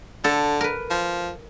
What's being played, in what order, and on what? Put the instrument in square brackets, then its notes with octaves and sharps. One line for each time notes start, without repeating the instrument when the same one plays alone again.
[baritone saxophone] D3 [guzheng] A4
[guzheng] A#4 B4
[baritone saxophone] F3